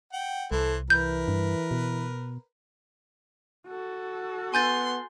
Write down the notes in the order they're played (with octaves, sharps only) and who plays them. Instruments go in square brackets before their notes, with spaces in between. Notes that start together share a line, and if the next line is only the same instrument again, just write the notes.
[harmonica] F#5 G5
[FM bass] C2 [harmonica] E3 C5 [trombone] A4
[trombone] E3 [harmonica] A#4 B4 [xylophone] G6
[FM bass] G2
B2
[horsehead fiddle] F#4 A4
[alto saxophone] B3 [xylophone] G#5 G6 A6 [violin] C6